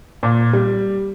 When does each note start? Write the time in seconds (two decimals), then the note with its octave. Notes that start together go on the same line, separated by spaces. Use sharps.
0.23 A#2
0.53 G3